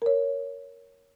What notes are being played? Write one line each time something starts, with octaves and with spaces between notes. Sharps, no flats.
A#4 C#5